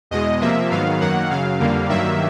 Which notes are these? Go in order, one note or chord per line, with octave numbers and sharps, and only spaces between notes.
E2 B2 G#3 D#5
C3 F3 A#3 E5
G#2 D#3 F#3 B3 F5
F#2 D#3 F#3 A#3 F#5
F#2 C#3 F#3 F5
F2 D3 G3 A#3
G2 D#3 F#3 A#3 E5